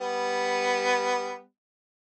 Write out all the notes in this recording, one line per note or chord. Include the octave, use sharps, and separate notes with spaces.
G3 B3